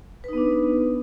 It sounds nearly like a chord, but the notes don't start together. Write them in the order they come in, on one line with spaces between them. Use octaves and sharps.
B4 D#4 B3 D4